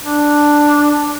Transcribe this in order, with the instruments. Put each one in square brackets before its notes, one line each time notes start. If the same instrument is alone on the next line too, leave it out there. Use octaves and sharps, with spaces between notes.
[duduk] D4